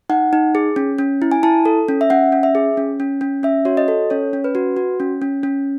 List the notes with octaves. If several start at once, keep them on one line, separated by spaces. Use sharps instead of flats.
D#4 F#5
D#4
G#4
C#4
C#4
E4
G#5
E4 A5
A4
C#4
E5
C#4 F#5
C#4
E5
G#4
C#4
C#4
C#4
C#4 E5
F#4 C#5
D#5
A4
C#4 C#5
C#4
B4
F#4
F#4
C#4
C#4
C#4